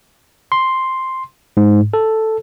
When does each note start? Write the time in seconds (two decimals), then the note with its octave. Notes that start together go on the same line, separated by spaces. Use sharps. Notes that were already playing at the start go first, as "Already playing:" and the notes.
0.52 C6
1.57 G#2
1.94 A4